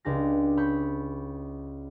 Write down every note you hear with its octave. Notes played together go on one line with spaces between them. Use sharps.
C#2 D4 G4 A#6
C#5 B5 C#6 G6